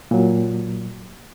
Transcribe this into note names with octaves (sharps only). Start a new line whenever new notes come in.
A#2 F#3